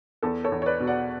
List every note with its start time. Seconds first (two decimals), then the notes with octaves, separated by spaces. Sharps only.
0.23 E2 A4
0.44 A4 C#5
0.52 E2
0.62 C#5
0.66 B4 D5
0.80 B2
0.87 D5 F#5